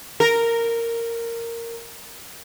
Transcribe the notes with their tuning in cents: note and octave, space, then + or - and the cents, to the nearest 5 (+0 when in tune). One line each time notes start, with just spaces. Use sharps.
A#4 -10